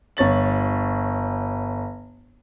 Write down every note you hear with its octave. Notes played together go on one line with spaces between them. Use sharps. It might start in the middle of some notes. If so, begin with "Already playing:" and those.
G1 C#5 A6 F#7